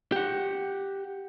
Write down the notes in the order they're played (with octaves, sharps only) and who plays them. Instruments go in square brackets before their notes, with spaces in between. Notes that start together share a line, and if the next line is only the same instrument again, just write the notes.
[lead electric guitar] G4 F#5